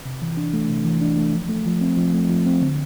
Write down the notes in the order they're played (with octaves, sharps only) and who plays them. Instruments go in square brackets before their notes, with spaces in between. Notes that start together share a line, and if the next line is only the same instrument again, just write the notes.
[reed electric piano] C3
E3
D4
A3
C3
E3
D4
A3
F3
A3
F3
C4
F3
A3
F3
C4
D3